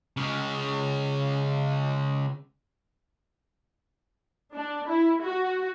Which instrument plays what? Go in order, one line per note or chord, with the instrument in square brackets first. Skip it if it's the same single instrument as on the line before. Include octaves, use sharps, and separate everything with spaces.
[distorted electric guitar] C#3 G#3
[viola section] D4
E4
F#4